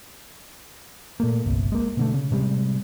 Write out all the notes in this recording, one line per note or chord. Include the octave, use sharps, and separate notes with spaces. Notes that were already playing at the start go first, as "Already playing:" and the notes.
A#2 A3 A#3
G1 C2
G#3 A#3
B2 D3 A3
C#3
A2 C3 G3 G#3